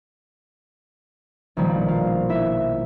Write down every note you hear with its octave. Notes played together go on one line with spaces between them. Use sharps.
A#1 B2 D#3 F3 G3
F4
E4 E5